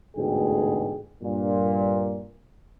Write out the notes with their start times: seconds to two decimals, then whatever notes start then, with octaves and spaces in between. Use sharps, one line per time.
0.17 A1 D2 G#2 B2 G#4 G5
1.23 G2 A#2